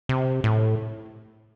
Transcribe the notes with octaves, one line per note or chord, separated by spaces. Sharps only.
C3
A2